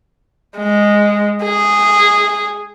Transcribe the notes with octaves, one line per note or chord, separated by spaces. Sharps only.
G#3
G#4